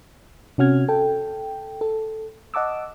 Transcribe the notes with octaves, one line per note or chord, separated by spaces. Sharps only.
C3 C#4 F#4 F6 G#6
A4 G5
A4
D#5 F#5 A5 D6 E6